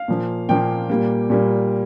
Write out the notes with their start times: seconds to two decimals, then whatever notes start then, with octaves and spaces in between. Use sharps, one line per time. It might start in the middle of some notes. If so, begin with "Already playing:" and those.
Already playing: F5
0.08 A#2 F3 A#3
0.49 A#2 F3 A#3 G5
0.90 A#2 G3 A#3
1.30 A#2 G3 A#3